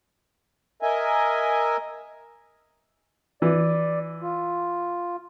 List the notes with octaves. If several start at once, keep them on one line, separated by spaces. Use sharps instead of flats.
A#4 D#5 E5 G#5
E3 D5
F4